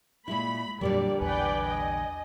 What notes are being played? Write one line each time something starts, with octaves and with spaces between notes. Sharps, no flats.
A#2 G#3 E4 B5
F2 A#2 D3 F#3 G3 G4 A#4 D5
A#1 E2 B4 D5 G5 G#5
D#5